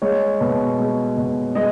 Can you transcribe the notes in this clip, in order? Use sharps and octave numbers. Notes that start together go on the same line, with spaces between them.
G#3 C#5
B2
G#3
B2
G#3 D#5